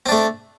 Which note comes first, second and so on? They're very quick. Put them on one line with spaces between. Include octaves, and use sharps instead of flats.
C4 D4 A3